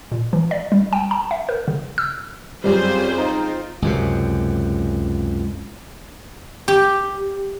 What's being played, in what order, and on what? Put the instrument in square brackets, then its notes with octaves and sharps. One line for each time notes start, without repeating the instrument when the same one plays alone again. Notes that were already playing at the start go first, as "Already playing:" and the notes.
[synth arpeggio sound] A#2
E3
D5
G3
G5
A5
E5
A#4
C#3
E6
[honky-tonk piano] F#2 G3 [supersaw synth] C4 C#4 F4 [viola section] G#4 C5
[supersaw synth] C4 D#4 F4 [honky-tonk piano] A#5
[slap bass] C#2 F#2 C3
[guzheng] G4